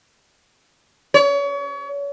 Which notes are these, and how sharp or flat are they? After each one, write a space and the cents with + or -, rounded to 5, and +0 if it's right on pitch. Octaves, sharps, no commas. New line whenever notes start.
C#5 +35